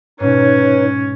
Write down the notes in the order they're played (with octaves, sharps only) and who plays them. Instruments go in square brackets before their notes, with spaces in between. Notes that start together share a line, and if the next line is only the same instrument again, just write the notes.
[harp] G#2 B2 [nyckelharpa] C#4 [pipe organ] D#4 B4 C#5